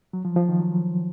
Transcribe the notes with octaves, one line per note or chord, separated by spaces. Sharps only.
F#3
F3
F3
D#3
F#3